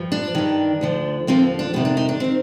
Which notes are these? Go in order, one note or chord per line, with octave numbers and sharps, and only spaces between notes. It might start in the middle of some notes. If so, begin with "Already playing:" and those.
Already playing: G2 F3
D4
G2 D#3
D2 D3 F3
D#2 D3 F3 C4
D4
F2 C3 D#3 B3
D4
D#4
D4
D#3 C4